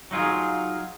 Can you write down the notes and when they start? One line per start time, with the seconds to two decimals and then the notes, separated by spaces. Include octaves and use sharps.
0.11 F#3 D#4 F4 G#4